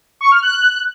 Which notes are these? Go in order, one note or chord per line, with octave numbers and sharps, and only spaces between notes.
C#6
F6
F#6